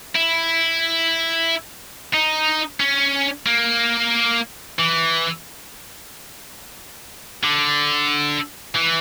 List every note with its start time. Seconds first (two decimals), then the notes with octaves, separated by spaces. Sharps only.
0.15 E4
2.14 D#4
2.80 C#4
3.46 A#3
4.79 E3
7.43 D3
8.75 E3